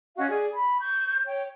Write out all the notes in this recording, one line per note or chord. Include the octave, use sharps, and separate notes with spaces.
C#4 F#4 D#5 F5
G#4 D5
B5
C#6 G6
C#5 G5